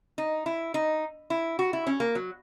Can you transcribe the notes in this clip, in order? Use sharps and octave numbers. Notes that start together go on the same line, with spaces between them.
D#4
E4
D#4
E4
F#4
E4
C#4
A#3
F#3